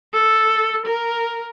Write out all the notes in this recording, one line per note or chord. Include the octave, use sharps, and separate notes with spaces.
A4
A#4